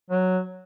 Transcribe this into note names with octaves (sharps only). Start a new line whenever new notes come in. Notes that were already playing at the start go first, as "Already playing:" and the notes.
F#3